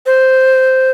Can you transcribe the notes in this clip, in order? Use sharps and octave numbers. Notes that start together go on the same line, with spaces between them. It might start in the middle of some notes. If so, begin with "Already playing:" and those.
C5